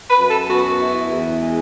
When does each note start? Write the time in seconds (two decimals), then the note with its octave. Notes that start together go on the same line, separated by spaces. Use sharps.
0.09 B4
0.19 F#2
0.29 A4
0.49 B3 F#4
0.80 E4
1.11 E2
1.42 G#3